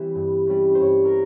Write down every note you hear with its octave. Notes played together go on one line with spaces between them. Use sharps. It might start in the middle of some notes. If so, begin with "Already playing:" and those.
Already playing: E3 G3 C4 E5
G2
G3 C#4
C5
G2 C#5
A#4